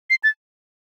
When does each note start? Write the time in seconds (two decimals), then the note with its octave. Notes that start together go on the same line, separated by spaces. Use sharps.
0.10 C7
0.24 A6